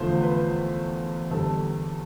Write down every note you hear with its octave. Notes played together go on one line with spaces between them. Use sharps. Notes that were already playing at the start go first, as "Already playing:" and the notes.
Already playing: E2 D3 F3 A3 C5
B4
E2 D3 G3 A4